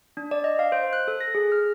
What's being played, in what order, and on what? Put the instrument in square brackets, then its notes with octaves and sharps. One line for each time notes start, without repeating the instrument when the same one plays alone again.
[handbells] D4
D5
D#5
F5
C5
F#6
A4
A#6
G#4
F6